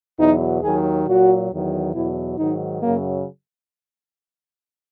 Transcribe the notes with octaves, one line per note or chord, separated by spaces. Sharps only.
E2 B2 F#3 D#4
D#2 D#3 F#3 G#4
A#2 F#3 F#4
E2 D#3 F#3
E2 B2 F#3 E4
G#2 D#3 F#3 D#4
F#2 C#3 F#3 A#3